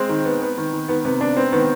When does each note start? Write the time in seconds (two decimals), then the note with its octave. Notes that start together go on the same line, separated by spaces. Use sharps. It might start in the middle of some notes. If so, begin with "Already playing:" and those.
Already playing: G#3 C4
0.09 D#3
0.25 B3
0.42 B3
0.58 D#3
0.73 D#3
0.88 D#3 B3
1.05 C3 B3
1.20 B3 D4
1.37 B3 C4
1.52 D#3 B3